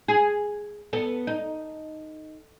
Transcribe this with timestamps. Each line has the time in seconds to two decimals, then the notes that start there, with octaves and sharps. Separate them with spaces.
0.08 G#4
0.93 B3 A4
1.27 D#4